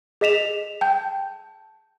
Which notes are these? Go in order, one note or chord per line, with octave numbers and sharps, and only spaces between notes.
G#4 D#5 B6 E7 F7
G5 A5 G6